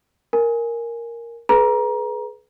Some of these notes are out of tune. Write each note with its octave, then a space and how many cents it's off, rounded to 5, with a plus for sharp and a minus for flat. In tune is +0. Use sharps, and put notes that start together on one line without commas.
A#4 +0 G#5 +0
G#4 +35 B4 +0 A#5 +25